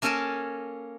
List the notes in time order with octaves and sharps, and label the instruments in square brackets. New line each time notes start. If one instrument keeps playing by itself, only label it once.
[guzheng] A#3 C#4 A4 A#4 G#5 A5